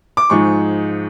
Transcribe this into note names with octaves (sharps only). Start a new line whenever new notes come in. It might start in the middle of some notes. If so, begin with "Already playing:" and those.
D6
G#2 F3 G#3 C#6